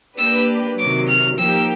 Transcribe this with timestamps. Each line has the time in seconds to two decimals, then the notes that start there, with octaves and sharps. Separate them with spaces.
0.18 A#3 D4 G4 B4 E6
0.79 C3 D#3 F#3 D6
1.08 F6
1.38 F3 A#3 D#4 G4 E6